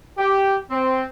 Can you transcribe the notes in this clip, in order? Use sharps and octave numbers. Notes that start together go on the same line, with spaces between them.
G4
C4